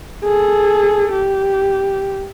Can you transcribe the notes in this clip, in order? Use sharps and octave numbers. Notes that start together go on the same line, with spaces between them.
G#4 A4
G4